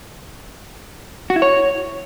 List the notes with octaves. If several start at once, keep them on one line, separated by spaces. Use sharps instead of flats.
F#4
E4
C#5